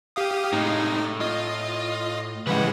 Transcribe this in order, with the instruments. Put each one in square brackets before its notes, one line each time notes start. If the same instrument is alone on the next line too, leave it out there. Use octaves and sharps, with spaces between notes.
[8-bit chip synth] G4 F5 D#6
[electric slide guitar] A2 [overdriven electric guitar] C3 G#3 [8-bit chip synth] D#4
[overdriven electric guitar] F4 [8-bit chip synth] D#5
[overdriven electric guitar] B1 F#5 [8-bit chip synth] C#3 E3 G#3 [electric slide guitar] G3 B4